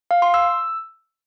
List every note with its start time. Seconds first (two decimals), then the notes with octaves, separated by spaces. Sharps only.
0.11 F5
0.22 C6
0.34 E6